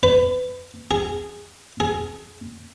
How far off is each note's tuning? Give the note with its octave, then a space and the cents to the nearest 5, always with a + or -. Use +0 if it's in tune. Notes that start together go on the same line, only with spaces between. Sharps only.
B4 +25
G#4 -10
G#4 +20